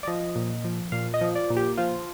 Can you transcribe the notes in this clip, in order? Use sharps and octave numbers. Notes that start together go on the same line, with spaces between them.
D5
F3 D#5
A#2
F3
A#2 F5
D#5
F3
D5
A#2
G4
F3 F4